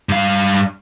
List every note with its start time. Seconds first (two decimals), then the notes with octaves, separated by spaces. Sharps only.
0.09 G2 F5